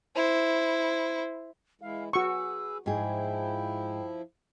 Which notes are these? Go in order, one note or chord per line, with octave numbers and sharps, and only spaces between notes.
E4 C5
E3 G#3 E4 F5
F#4 G#4 B4 C#6 E6
G#2 F3 E4 G#4 G5